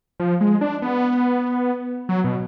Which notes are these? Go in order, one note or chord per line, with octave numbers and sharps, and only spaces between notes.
F3
G#3
D4
B3
F#3
B2